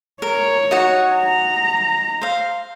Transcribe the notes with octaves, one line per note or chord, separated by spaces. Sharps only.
A#4 C#5
D#4 F#4 F#5
A#5
C5 F5